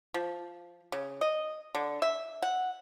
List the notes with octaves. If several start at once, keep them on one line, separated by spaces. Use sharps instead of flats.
F3
C#3
D#5
D3
E5
F#5